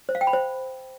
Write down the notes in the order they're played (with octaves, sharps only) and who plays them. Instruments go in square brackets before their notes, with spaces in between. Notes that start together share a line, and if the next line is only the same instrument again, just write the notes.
[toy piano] C5
F5
G5
B5
C5